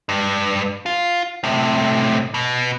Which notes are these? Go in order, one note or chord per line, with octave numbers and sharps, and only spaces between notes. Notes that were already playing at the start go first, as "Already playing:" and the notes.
G2
F4
A2 C3
B2